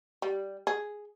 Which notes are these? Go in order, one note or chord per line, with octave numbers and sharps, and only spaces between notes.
G3
G#4